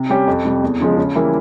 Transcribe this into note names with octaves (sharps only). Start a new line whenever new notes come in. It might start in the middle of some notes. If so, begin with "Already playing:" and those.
Already playing: C3
G3 C#4 G4
F2
C3 G3
E2
C#3 F3 G#3
C#3
E3 G3 A#3 E4